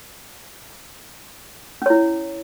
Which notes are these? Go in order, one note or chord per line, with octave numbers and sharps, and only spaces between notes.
C#4 E4 C#5